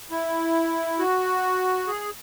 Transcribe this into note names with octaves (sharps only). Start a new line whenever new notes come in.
E4
F#4
G#4